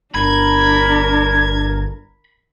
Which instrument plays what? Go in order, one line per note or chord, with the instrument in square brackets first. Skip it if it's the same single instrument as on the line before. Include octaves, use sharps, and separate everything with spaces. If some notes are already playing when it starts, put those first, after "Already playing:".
[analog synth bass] G1 [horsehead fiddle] D4 A#4 [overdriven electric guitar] B5 [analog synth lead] G#6